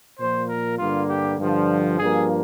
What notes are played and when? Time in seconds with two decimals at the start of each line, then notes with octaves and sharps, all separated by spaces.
0.19 A#2 F3 A#3 C5
0.49 A#4
0.79 G2 D3 G3 A#3 F4
1.10 G4
1.39 G2 D3 F3
1.99 G2 F3 A#3 G#4